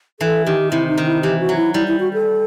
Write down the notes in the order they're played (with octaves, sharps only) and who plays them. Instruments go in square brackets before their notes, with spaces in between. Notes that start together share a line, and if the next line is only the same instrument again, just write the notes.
[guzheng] E3 [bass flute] A4
[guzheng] D#3 [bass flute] G4
[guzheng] C3 [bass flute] E4
[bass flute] D#4
[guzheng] D#3
[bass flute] E4
[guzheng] E3 [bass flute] G4
[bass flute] F#4
[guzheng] F#3
[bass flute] E4
[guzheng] G3 [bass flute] E4
[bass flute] E4
F#4
A4